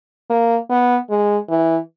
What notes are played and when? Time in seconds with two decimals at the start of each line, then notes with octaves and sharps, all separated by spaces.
0.30 A#3
0.70 B3
1.10 G#3
1.49 E3